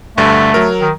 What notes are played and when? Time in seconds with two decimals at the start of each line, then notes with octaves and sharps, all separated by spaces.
0.17 D2 G2 D3 A3
0.54 F#3 A#4
0.81 D#3